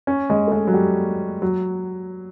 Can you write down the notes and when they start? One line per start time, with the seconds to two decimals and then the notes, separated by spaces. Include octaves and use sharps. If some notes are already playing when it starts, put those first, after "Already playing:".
0.07 C#4
0.30 G#3
0.47 A3
0.52 G#3
0.67 F#3
0.74 G3
1.42 F#3